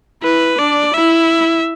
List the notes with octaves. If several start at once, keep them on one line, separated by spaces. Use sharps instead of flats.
E4 B4
D4 D5
E4 E5